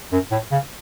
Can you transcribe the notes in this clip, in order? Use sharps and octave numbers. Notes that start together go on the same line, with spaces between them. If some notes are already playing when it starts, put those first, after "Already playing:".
F#2
A2
C#3